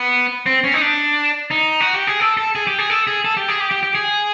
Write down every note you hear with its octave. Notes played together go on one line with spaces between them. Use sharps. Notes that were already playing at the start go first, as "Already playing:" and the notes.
Already playing: B3
C4
C#4
D#4
D4
D#4
F#4
G4
G#4
A4
A4
G#4
G4
G#4
A4
G#4
A4
G4
G#4
G4
G4
G4
G#4